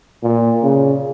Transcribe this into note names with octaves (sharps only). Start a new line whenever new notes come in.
A#2
C#3